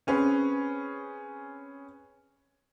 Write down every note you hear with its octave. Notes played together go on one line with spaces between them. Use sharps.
C4 C#4 G#4 B4